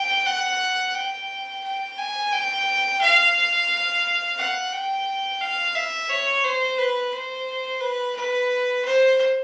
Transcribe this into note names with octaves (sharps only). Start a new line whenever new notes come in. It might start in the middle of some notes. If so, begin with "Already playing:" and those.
Already playing: G5
F#5
G5
G5
G#5
G5
F5
F#5
G5
F5
E5
C#5
C5
B4
C5
B4
B4
C5